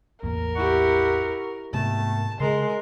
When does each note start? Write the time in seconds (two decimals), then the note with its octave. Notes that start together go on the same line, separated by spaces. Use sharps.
0.23 A1 E2 A#3 A#4
0.56 E4 G4 F#5 C#6
1.74 G#2 C3 D#3 A3 B3 A5
2.40 C#3 G#3 A#4 C6